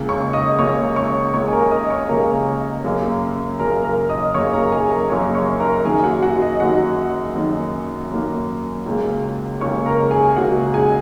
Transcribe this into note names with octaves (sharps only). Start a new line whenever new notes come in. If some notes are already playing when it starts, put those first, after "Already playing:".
Already playing: C#2 C#3 A#3
C#5 C#6
D#5 D#6
C#2 C#3 A#3 C#5 C#6
C#5 C#6
C#2 C#3 A#3 C#5 C#6
G#5
A#4 A#5
D#5 D#6
C#5 C#6
C#2 C#3 A#3 A#4 A#5
F#2 C#3 A#3
F#2 C#3 A#3 A#4 A#5
A#4 A#5
D#5 D#6
F#2 C#3 A#3 C#5 C#6
A#4 A#5
G#4 G#5
A#4 A#5
F#2 C#3 A#3 C#5 C#6
C#5 C#6
A#4 A#5
F#2 D#3 A#3 G#4 G#5
F#4 F#5
F#4 F#5
D#5
F#2 D#3 A#3 F#4 F#5
F#2 D#3 A#3
F#2 D#3 A#3
C#2 C#3 A#3
C#2 C#3 A#3 C#5 C#6
A#4 A#5
G#4 G#5
C#2 C#3 A#3 F#4 F#5
G#4 G#5